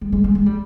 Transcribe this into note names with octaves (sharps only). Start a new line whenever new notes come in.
G#3
G#3
G#3
G#3
G3